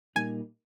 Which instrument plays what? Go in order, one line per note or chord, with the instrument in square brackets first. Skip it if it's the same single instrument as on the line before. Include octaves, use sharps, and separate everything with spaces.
[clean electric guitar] A#2 G3 A#3 D#4 [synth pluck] G#5